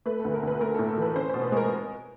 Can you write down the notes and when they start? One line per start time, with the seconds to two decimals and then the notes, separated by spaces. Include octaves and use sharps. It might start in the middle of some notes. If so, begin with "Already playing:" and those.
0.06 A3 B4
0.20 D2 A4
0.34 A#4
0.43 D2 B4
0.60 A3 A#4
0.75 A2 A4
0.88 A4
0.98 E3 B4
1.16 C#4 C5
1.30 B2 C5
1.43 B4
1.52 G#3 A#4